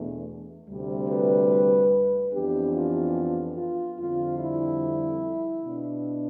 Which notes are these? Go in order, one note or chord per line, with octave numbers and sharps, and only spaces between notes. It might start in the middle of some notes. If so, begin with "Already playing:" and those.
Already playing: E2 B2 A3 D4
D2 C3 G3
B4
F2 E3 B3 D4 G4
F4
F4
F2 D3 G3 C4 F4
E4
B2 B3 D4